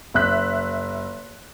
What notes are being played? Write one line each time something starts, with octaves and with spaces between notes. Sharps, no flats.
F#1 E5 F#6 B6